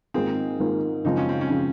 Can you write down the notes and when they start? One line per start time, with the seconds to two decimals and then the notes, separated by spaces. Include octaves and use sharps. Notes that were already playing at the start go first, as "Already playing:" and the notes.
0.14 G#2 D#3 A#3 C4 F4 G#4
0.60 G#2 D#3 A#3 F4 G#4
1.04 F#2 C#3 F3 G#3 C4 D#4
1.17 C#4
1.29 C4
1.41 C#4
1.49 C#3 F3 G#3 C4